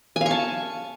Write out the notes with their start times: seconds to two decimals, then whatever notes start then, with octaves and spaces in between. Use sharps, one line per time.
0.16 G#5
0.21 F5
0.26 C#6
0.31 A5